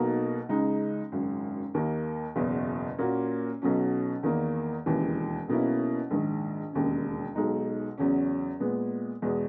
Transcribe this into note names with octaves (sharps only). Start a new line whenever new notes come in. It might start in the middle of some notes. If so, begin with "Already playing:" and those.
Already playing: B1 B2 A#3 D#4 F#4
C#2 C#3 G#3 D#4
G#1 F#2 C#3
D#2 D#3 A#3
F#1 E2 B2
A#2 A#3 C#4 F#4
B1 B2 F#3 C#4
E2 D#3 A#3
E1 D#2 C#3 E3
B1 B2 A#3 C#4 E4
A#1 G#2 D#3
E1 D#2 C#3
B1 B2 G#3 D#4
E2 C#3 F#3 C#4
A#2 G#3 B3
E2 B2 G#3